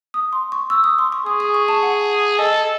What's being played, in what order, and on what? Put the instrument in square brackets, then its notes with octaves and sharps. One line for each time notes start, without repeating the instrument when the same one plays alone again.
[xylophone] D#6
C6
C#6
E6
D#6
C6
C#6
[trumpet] G#4 [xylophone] D#6
[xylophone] D#6
C#6
A5
F#5
[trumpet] A4 [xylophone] D#5